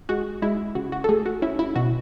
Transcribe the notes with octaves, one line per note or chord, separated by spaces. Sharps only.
G#3 F#4
G#3 E4
C#3 F#4
F#4
A4
A3 G#4
F#4
C#4 E4
E4
B2 F#4